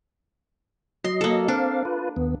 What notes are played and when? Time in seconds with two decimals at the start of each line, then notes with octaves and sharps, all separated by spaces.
1.04 F#3 D#5 C6
1.21 A#3 A4
1.48 C4 D4 F5
1.85 F4 B4
2.16 D#2 B3